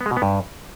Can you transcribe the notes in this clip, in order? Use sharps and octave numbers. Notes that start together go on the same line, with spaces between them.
B3
G#3
B2
B3
G2